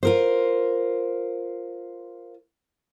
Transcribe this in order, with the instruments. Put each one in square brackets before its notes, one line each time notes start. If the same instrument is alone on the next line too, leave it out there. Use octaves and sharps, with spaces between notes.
[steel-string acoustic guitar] F4 A#4 C5